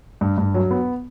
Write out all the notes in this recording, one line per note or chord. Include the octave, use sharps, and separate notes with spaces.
G2
G2
F#3
B3